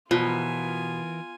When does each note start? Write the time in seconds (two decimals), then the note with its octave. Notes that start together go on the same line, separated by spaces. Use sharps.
0.11 B2 E3 F3 F4 A#4 G#5